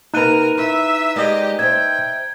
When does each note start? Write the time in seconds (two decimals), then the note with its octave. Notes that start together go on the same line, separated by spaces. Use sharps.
0.14 C3 A#3 D#4 A#4 B4 A#5 F#6 D#7
0.57 E4 E5
1.16 G#3 G4 A#4 D5 D#5
1.59 C5 D#5 E5 G5 G#6